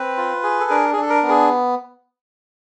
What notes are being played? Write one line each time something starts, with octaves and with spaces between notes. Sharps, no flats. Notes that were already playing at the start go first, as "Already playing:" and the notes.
Already playing: C4 B4
F4
G#4
A4
D4 A#4
G#4
D4 A4
A#4
B3
G#4